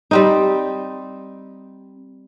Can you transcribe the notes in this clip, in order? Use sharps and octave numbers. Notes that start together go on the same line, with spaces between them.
G3 C4 D#4